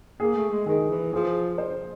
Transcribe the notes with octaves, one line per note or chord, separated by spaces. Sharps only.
A#3 G#4
A3
G#3
D#3 G#4
E3
F3 G#4
C5